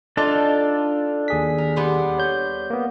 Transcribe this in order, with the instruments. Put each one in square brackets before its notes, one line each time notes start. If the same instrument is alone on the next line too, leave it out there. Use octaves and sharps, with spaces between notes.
[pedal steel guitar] D4 A4 A5 [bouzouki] D#4 F4 D5
[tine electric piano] D#2 G#4 B6
[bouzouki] A#4
G3 B3 C5
[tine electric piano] C#5 G6
A#3 B3